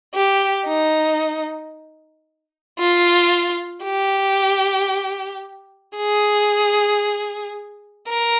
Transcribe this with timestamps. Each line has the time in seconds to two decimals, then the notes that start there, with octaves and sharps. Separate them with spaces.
0.15 G4
0.67 D#4
2.79 F4
3.85 G4
5.97 G#4
8.08 A#4